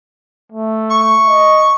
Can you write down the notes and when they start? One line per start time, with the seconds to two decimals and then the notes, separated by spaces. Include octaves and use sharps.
0.52 A3
0.91 C#6
1.27 D#5